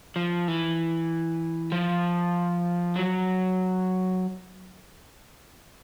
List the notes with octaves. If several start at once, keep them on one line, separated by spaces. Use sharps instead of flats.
F3
E3
F3
F#3